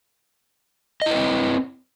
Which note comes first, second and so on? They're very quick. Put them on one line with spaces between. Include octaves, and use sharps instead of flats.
D#5 E4 B4 C4